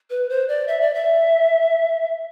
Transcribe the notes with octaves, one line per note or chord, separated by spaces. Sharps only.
B4
C5
D5
E5
D5
E5